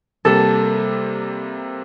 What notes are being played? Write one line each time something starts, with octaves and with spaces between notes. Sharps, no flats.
C3 G3 A#3 A4